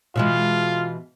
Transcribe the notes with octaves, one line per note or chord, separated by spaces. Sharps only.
B2 E3 G#3 F4